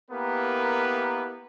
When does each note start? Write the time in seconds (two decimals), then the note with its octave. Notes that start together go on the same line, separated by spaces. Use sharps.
0.11 A#3 B3 E4 G4 A#4 B4